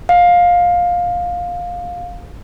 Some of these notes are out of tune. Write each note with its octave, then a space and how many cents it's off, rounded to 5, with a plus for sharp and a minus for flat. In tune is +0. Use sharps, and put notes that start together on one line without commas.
F5 +15